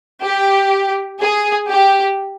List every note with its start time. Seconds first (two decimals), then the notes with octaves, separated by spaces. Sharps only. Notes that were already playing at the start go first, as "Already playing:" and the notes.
0.24 G4
1.20 G#4
1.68 G4